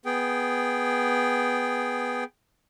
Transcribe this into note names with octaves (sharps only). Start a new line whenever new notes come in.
B3 G#4 G5